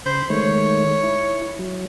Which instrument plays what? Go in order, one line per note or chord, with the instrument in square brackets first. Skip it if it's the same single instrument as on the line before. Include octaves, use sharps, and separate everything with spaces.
[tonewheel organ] C#3 B5 C6 [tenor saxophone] C5
[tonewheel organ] D#3 G#3 A3 [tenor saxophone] C#5
[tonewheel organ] E4
F#3